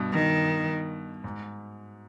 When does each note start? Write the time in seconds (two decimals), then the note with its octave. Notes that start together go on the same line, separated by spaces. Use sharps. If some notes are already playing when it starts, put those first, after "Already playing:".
Already playing: G2 B2
0.13 D#3
1.24 G#2